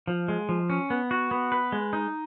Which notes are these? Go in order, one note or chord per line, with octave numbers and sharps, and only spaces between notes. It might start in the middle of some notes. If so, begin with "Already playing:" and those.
F3
G#3
F3
C#4
B3
F#4
B3
B4
G#3
D#4